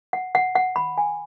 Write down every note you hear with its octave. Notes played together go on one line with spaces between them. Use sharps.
F#5
F#5
F#5
B5
G#5